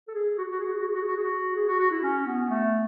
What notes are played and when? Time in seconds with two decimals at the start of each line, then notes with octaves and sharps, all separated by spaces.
0.08 A4
0.14 G#4
0.38 F#4
0.44 G#4
0.51 F#4
0.59 G#4
0.66 F#4
0.73 G#4
0.80 F#4
0.88 G#4
0.95 F#4
1.01 G#4
1.08 F#4
1.16 G#4
1.23 F#4
1.56 G#4
1.68 F#4
1.79 F#4
1.91 E4
2.03 C#4
2.26 B3
2.49 A3